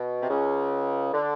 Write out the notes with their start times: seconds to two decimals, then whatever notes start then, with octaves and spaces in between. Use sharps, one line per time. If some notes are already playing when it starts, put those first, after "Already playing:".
Already playing: B2
0.22 C3
0.30 C#2 C#3
1.13 D3